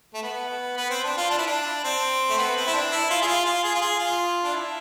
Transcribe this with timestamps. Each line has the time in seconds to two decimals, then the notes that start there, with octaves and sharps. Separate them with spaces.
0.14 A3
0.23 B3
0.77 B3
0.90 C4
1.04 D4
1.18 F4
1.31 D4
1.38 E4
1.47 D4
1.84 C4
2.30 A3
2.38 B3
2.56 C4
2.67 E4
2.74 D4
2.91 E4
3.10 F4
3.22 G#4
3.27 F4
3.45 F4
3.64 G#4
3.75 F4
3.81 G#4
3.99 F4
4.44 D4
4.53 E4